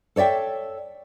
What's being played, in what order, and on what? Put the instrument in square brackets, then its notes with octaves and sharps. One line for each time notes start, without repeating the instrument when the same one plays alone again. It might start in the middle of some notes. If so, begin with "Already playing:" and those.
[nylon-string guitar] A4 C#5 D5 E5 G5